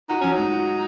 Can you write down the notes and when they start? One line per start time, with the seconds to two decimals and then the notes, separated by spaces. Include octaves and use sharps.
0.09 D#4 F#4
0.21 F#3 C#4
0.32 D#4
0.38 G#2
0.52 F#4